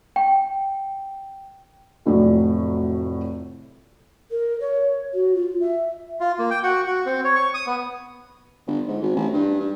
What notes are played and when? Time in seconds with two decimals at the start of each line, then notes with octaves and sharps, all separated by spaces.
0.16 G5
2.06 F1 A2 F#3 D5
4.31 A#4
4.60 C#5
5.14 F#4
5.35 F4
5.61 E5
6.20 F4
6.39 A#3
6.50 G5
6.63 F#4
6.87 F#4
7.06 C4
7.24 C#5
7.36 C#6
7.54 D#6
7.66 B3
8.66 G1
8.87 G#2
9.02 G#1
9.15 A1
9.33 G2
9.60 G2